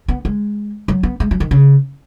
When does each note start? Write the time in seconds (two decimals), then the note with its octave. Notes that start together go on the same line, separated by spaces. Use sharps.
0.08 B3
0.25 G#3
0.88 F#3
1.03 B3
1.20 G#3
1.31 F#3
1.40 D#3
1.51 C#3